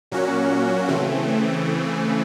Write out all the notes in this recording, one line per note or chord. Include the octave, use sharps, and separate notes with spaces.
A#2 F#3 A#3 C#4 F#4
C#3 E3 A3 C4